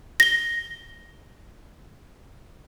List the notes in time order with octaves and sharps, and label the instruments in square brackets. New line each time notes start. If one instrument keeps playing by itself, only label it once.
[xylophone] A#6 G7